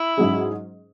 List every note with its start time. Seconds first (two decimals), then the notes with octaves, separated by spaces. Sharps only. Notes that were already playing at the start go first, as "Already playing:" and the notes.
Already playing: E4
0.17 G#2 F#3 C#4 G#4